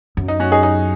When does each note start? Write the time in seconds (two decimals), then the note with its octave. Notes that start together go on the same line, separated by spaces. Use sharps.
0.17 F#2
0.28 D#4
0.40 C#4 F#4
0.52 D#4 G#4
0.63 D#4 G#4